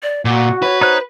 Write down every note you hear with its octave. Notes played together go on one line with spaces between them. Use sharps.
D5
A#2 F#4 F#5
B4 C#5
D#4 C5 C#5 F#6